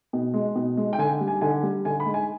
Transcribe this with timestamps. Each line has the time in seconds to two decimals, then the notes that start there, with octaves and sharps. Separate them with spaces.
0.13 B2
0.34 G#3
0.55 B2
0.77 G#3
0.93 G5
0.99 D3 G#5
1.21 G3
1.27 G#5
1.41 D3 G#5
1.63 G3
1.85 D3 G#5
2.00 B5
2.06 G#3
2.14 G#5